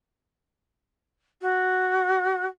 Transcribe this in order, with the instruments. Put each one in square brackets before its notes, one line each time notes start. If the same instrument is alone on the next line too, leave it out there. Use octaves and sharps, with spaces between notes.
[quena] F#4